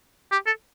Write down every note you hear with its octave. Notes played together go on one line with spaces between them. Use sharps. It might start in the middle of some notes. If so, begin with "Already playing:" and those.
G4
A4